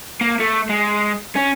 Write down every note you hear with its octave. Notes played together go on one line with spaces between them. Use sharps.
A#3
A3
G#3
C#4